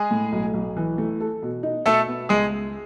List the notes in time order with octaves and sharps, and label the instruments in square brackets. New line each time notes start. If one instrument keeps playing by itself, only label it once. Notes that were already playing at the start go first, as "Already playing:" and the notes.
Already playing: [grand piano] G#3 G#4
[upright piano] A2
B1
B1
E3
A3
A4
B2
D#4
[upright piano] B2 [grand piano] A3 A4
[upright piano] B3
[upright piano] C#2 [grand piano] G#3 G#4
[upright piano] G#3